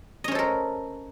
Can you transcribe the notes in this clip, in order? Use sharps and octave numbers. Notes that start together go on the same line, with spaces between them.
C#4 A4 A#4 C5 D#5